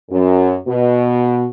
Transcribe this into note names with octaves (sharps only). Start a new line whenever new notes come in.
F#2
B2